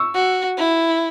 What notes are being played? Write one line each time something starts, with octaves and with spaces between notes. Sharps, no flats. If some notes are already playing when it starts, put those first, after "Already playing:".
Already playing: C#6 E6
F#4
E4